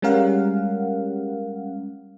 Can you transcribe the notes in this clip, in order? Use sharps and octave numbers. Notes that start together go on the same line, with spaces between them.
G3 G#3 C#4 A#4 F5 F#5